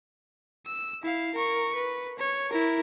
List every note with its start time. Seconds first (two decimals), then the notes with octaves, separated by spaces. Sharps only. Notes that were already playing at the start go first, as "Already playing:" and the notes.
0.66 E6
1.03 E4 F5
1.35 A#4 C#6
1.75 B4
2.19 C#5
2.49 E4 A#4